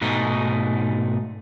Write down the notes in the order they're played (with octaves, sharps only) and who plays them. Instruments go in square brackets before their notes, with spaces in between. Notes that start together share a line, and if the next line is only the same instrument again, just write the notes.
[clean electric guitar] G#2 B2 A3 D#4